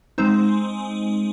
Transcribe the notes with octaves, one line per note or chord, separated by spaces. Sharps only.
G#3 C4 D#4 C5